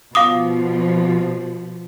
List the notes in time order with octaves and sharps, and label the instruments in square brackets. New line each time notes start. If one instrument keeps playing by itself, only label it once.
[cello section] B2 F3 [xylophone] F5 D6 D#6